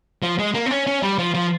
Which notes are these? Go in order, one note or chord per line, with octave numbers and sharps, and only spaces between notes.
F3
G#3
A#3
C4
C#4
C#4
G3
F3
F3